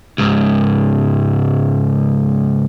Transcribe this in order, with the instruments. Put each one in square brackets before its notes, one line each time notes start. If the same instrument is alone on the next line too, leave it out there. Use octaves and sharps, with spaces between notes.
[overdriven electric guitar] C#2 G#2